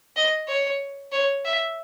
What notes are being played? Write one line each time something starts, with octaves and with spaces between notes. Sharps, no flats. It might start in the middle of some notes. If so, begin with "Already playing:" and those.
D#5
C#5
C#5
E5